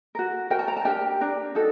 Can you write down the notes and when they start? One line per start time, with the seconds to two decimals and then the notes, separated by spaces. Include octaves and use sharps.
0.15 F#4 A#4
0.50 F#4 A#4 G5
0.59 A5
0.68 A#5
0.77 A5
0.85 D4 G4 A#4 G5
1.21 D4 G4 A#4
1.55 D#4 F#4 A4